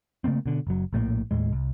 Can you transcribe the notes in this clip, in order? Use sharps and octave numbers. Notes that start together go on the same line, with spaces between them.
C#3 A3 A#3 C4
B2 D3
F#1 F#3
A#1 A2 E3 A#3
D#2 A2 G#3
C2